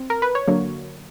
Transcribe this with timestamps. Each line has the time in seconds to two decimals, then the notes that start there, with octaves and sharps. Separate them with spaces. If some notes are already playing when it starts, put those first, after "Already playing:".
Already playing: C4
0.10 A#4
0.22 B4
0.35 C#5
0.47 D3 F#3 A#3